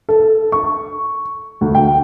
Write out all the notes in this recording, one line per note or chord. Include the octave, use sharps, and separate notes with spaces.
A4
C#6
D2
G5